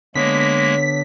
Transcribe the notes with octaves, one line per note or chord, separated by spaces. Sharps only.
D3 G#3 A#3 B3 C#5 B6